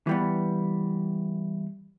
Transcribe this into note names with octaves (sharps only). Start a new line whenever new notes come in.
E3 G3 B3